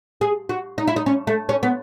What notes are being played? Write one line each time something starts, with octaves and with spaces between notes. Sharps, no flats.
G#4
F#4
D#4
E4
D#4
C#4
A3
C#4
B3